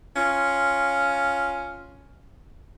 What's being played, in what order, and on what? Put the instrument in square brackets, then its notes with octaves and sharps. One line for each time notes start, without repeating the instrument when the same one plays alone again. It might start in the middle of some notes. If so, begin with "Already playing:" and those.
[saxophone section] C#4 F4